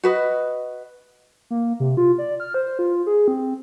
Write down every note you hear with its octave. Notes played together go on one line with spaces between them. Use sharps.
F#4 B4 D#5
A#3
C3
F4
D5
F6
C5
F4
G#4
C4